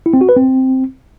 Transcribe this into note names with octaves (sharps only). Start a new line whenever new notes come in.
E4
C4
F#4
B4
C4